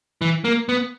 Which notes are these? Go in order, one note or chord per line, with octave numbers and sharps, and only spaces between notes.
E3
A#3
B3